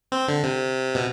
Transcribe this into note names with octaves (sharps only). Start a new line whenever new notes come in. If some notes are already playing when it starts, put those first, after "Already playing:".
C4
D3
C3
B2